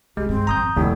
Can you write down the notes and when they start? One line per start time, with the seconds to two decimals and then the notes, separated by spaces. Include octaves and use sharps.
0.17 C2 G#3 G4
0.29 G2 G3 C4
0.47 G#1 F2 A#5 D#6 G6
0.76 F1 D#2 E4